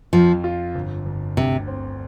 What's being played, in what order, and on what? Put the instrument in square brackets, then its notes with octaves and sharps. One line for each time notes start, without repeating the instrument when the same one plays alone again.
[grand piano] F2 [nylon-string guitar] F3
[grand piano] F4
G1
G1
[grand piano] D2 [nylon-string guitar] C3
[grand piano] C4